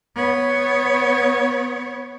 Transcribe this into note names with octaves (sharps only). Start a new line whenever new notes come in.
B3 C#5